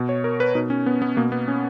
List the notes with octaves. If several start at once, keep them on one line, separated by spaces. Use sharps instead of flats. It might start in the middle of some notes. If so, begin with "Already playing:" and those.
Already playing: B2
C#5
A#4
B4
B2 D#4
C#4
B3
B3
B2 A#3
B3
C#4